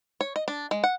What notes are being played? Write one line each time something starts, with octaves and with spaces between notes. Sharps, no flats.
C#5
D#5
D4
G#3
F#5